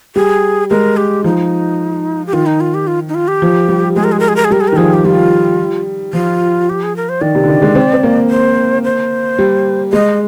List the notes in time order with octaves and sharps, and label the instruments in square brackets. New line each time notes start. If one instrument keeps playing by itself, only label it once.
[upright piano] G3 [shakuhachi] G#4
[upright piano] G#3 [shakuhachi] A#4
[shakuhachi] G4
[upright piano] F3 [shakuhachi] D#4
[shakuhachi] G4
[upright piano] D#3 [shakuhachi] F4
[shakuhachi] D#4
F4
G4
F4
D#4
F4
G4
[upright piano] F3
G3
[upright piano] G#3 [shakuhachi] G#4
[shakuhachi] A#4
G#4
A#4
G#4
A#4
G#4
[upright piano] G3 [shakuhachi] A#4
[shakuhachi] G#4
A#4
[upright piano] D#3
[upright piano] F3 [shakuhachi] G#4
[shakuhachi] G4
[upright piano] G3 [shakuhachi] F4
[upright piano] F3 [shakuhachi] F4
[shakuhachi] G4
G#4
A#4
C5
[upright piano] D#3 [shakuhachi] D5
[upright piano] C3
D3
D#3
G#3
C4
C4
A#3
[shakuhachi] C5
C5
[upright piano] G3
[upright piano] G#3 [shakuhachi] D#5